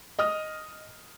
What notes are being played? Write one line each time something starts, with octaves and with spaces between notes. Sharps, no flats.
D#5 D#6 F6